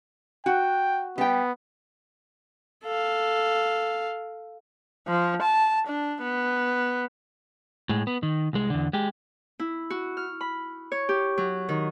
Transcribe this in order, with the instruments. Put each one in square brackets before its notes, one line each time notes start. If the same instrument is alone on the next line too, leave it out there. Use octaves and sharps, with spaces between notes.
[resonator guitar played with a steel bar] F#4 [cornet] G5
[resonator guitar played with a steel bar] G3 G5 [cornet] B3
[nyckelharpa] A4 F5
[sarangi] F3
A5
D4
B3
[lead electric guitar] A2 G#3
B3
D#3
C2 G#3
E2 D3
G#3 G4
[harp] E4
F#4
F6
B5
C#5
G4
F#3
D#3